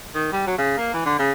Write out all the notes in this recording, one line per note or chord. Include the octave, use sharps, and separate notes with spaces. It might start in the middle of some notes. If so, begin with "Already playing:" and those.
D#3
G3
F#3
C#3
A#3
E3
D3
C#3